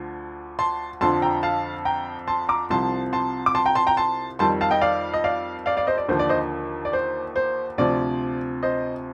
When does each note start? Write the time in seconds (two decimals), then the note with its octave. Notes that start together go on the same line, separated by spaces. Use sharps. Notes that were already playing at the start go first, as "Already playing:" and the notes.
Already playing: D2 D3 F3
0.59 A5 C6
1.01 F2 D3 F3 A5 C6
1.22 G5 A#5
1.43 F5 A5
1.85 G5 A#5
2.28 A5 C6
2.49 A#5 D6
2.70 C2 C3 F3 A5 C6
3.13 A5 C6
3.46 D6
3.55 A5 C6
3.65 G5 A#5
3.75 A5 C6
3.87 G5 A#5
3.97 A5 C6
4.39 F2 D#3 G3 A5 C6
4.61 F5 A5
4.71 D#5 G5
4.81 D5 F5
5.14 D#5
5.24 D5 F5
5.66 D5 F5
5.77 D5 F5
5.87 C5 D#5
5.98 D5
6.08 D#2 D3 F3 C5
6.19 D5
6.29 C5 D#5
6.85 D5
6.93 C5
7.36 C5
7.78 D2 C3 F3 D5
8.63 C5 D#5